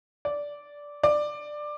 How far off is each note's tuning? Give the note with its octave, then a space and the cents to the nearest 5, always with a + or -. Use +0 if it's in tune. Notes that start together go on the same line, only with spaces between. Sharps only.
D5 -10
D5 +15